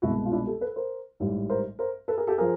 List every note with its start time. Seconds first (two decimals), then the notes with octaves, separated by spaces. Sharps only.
0.02 C2 B2 G#3 E4 F#4
0.26 F4
0.32 D4 E4
0.47 G4 A4
0.61 A4 B4
0.76 A#4 C5
1.20 A1 G#2 E3 G3
1.50 A#4 C5
1.79 A#4 C5
2.08 A4 B4
2.18 G#4 A#4
2.27 G4 A4
2.38 F3 G#4 A#4